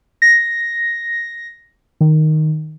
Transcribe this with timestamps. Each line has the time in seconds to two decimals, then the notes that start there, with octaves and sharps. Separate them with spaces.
0.22 A#6
2.01 D#3